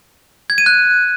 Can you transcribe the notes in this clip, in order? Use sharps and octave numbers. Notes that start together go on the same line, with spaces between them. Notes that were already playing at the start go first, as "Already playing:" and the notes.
G#6
D#7
F#6